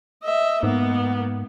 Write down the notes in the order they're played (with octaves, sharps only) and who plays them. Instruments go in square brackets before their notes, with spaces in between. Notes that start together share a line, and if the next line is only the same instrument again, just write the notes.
[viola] D#5 E5
[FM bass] G#2 [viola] A#3 B3